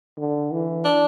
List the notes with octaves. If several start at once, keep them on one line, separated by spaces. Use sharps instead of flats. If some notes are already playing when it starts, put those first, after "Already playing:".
D3
E3
D4